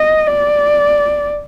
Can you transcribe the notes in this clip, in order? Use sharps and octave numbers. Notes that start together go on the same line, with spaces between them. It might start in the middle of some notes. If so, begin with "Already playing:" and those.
Already playing: D#5
D5